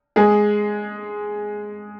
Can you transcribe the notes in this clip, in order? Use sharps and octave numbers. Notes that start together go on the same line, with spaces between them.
G#3 G#4